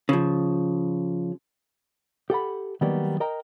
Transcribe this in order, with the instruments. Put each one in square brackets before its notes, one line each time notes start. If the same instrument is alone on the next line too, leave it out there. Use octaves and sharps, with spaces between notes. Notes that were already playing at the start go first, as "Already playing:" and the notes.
[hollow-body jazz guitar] C#3 F3
G4 A4 F#5 B5
D#3 F#3 G3 A#3 B3
A#4 D#5 G5 A#5